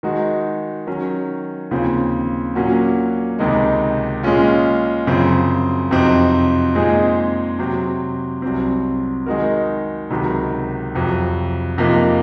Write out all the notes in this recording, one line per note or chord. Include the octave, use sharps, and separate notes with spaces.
D#3 G#3 D#4 F#4
D#3 F#3 C#4
D#2 C#3 F3 C4
A#2 F#3 A#3 C#4 F#4
C#2 C3 D#3 G#3 D#4
A#2 G#3 C#4 F4
F#2 C#3 F3 C4
F2 C3 F#3 C4 D#4
A#2 G#3 C4 D#4 G#4
C3 F#3 C4
C2 C3 F#3 C4
D#3 G#3 D#4 F#4 A#4
C#2 C3 D#3 F#3
F2 C3 F#3
F2 C3 F3 A#3 D#4